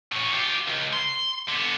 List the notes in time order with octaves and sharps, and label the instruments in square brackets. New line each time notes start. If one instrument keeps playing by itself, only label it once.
[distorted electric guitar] A2 C#4
F4 G4
C#2
C6
D3 B3